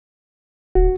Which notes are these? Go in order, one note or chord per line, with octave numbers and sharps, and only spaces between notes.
D1 F#4